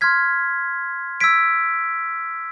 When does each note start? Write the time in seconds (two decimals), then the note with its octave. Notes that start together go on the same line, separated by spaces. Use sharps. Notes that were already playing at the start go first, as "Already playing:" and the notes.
0.01 C6 F6 G#6 B6
1.21 E6 G#6 B6 D7